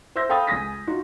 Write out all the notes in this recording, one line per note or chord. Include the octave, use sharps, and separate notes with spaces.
C5 E5 C6 E6 G6 A#6
A4 F5 G5 B5 D#6 A6
C#2 G#5 D#6 A#6 B6
D#4 F4 F#4